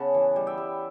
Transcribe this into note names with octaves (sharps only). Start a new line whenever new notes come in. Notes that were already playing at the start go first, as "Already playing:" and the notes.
Already playing: C#3 B3 F#5 A5
E3
G3
E5 G5
G3